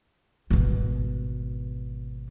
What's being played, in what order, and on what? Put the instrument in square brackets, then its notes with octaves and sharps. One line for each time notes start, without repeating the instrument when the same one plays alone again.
[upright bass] G#1 B2